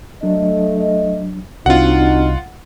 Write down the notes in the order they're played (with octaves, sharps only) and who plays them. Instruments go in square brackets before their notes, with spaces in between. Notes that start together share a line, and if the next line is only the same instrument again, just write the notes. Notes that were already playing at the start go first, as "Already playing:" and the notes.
[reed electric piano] F#3 D4 [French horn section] A3 D#5
[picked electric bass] C2 [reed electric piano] C4 D4 F#4 [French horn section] D#4 [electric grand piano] F4 F#5